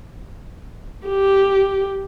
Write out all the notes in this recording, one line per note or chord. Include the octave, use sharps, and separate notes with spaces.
G4